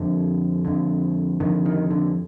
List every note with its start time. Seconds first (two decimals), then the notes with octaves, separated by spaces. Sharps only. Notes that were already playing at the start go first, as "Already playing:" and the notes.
Already playing: F2 D3
0.65 F2 D3
1.40 F2 D3 D#3
1.66 D#3
1.91 D3